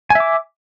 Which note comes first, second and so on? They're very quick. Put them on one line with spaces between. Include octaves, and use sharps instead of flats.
G#5 E5 D6